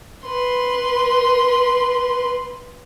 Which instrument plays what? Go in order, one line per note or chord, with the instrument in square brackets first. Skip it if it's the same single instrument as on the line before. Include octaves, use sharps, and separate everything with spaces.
[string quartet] B4 C6